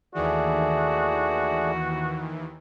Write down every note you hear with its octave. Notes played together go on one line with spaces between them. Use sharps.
D#2 D#3 E3 A3 F#4 G#4 D5